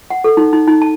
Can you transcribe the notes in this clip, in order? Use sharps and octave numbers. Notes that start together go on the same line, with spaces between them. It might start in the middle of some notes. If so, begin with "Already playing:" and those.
F#5
A4
D#4
D#4
D#4
A5